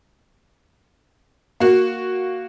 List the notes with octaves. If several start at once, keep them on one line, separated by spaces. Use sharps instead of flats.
A#3 F#4